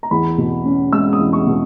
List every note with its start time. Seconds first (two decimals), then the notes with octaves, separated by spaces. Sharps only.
0.03 A#5
0.11 E2 B5
0.38 B2
0.65 C#4
0.92 G#3 E6
1.13 D#6
1.19 E2
1.33 C#6
1.47 B2